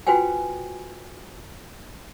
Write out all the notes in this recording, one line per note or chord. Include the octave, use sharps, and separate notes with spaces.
F4 F#4 B4 C5 G5 G#5